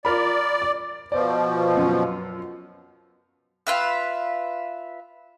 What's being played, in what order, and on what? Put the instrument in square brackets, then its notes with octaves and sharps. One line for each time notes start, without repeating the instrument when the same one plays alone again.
[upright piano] F4 A#4 B5 [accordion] D5
[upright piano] D6
[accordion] B2 F3 [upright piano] D5
[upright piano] F#2 F4
[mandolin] F4 B4 E5